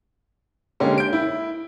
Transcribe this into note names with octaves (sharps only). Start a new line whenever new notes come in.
D3 G#3 A#3 C#4 G4
G6 D7
E4